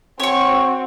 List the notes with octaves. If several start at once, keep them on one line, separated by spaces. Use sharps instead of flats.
C4 F#4 C#5 C#6